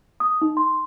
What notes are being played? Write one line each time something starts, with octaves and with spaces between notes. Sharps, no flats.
D#6
D#4
C6